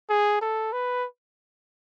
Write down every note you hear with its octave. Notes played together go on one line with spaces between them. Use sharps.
G#4
A4
B4